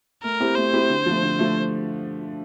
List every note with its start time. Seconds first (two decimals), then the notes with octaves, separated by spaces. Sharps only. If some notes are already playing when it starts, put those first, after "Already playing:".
0.24 A3 A#4
0.40 C4 E4 G4
0.56 A3 C5
0.73 C4 E4 G4
0.90 D3
1.06 F3 A3
1.23 D3
1.39 F3 A3